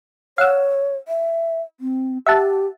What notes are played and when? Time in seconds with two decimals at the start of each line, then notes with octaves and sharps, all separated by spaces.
0.38 C#5 F5 F#5 E6
1.08 E5
1.80 C4
2.26 G4 E5 F#5 A5